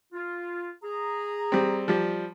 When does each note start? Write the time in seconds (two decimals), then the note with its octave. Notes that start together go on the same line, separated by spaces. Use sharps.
0.13 F4
0.83 G#4 A#5
1.52 G3 C4
1.88 F3 G3